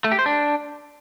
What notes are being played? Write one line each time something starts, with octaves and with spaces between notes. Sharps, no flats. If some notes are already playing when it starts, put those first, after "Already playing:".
A3
G4
C5
D4